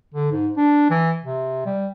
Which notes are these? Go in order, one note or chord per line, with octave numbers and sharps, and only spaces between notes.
D3
G#2
D4
E3
C3
G3